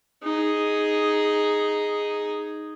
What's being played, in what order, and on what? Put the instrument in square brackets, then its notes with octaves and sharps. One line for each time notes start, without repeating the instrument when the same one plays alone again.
[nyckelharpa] D#4 G#4